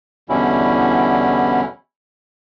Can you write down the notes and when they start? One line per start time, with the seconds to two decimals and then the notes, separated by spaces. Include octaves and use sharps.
0.29 E2 B2 D3 G3 C#4 E4